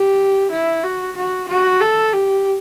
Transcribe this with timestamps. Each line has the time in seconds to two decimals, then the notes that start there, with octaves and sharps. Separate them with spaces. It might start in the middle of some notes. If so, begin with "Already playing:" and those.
Already playing: G4
0.51 E4
0.83 F#4
1.16 F#4
1.48 F#4
1.81 A4
2.13 G4